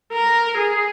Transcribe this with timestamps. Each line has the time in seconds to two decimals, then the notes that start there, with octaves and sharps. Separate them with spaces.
0.13 A#4
0.58 G#4